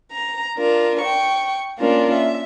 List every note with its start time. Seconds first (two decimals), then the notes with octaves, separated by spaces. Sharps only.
0.12 A#5
0.57 D4 F4 A#4
1.01 G5 C#6
1.78 A#3 C#4 D4 F4 A#4
2.14 E5